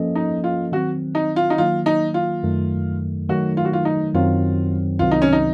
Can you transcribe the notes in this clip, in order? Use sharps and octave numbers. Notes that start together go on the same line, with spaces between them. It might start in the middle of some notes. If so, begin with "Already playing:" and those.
Already playing: F3 A#3 C#4 A4 D#5
D#4
F4
D#3 F#3 C4 F#4
D#4
F4
D#4
D#3 F#3 A#3 F4
D#4
F4
F#2 D#3 F#3 A3
D#3 F#3 A3 D#4 F#4
F4
F#4
F4
D#4
F#2 D#3 F#3 C4 F4
C2 C3 D#3 F#3 C4 F4
D#4
C#4
D#4